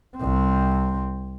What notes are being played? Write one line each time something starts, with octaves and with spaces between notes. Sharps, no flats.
C2 C4